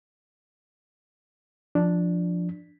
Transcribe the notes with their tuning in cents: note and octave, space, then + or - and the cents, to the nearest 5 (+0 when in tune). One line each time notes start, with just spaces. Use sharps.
F3 +0 D4 +0